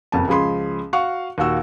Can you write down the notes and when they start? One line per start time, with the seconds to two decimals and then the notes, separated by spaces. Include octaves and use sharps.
0.12 F#1 F2 A5
0.28 C#2 F3 G#4 B5 C6
0.93 F#4 F5 F#5 C#6
1.38 D#2 A#2 F#4 E6